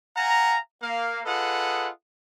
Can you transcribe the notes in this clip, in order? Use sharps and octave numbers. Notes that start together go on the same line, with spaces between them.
F5 F#5 G#5 A#5
A#3 F5
F4 G#4 A4 B4 D#5 F#5